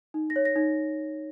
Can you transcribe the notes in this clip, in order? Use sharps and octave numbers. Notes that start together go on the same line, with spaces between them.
D#4
A#6
C#5
A#6
D#4